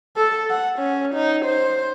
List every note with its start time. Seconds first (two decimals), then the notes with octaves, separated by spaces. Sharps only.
0.17 A4
0.50 F#5
0.79 C#4
1.14 D#4
1.45 C5